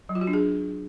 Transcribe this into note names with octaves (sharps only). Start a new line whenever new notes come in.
F#3
F4
F#4
D4
G#4